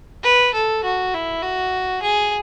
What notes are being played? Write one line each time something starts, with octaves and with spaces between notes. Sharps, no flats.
B4
A4
F#4
E4
F#4
G#4